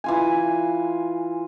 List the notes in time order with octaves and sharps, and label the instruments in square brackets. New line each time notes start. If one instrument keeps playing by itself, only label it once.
[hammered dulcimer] E3 F4 G#5